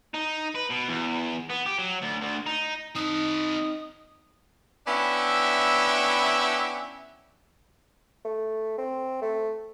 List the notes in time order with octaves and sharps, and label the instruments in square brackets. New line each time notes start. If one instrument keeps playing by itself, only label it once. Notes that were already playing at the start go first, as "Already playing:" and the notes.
[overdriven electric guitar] D#4
B4
B2
E2
B3
G4
F#3
D2
D2
D#4
[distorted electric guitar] C4 D#5 [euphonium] D#4 [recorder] D#6
[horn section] B3 C#4 D4 E4 E5 G5
[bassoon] A3
C4
A3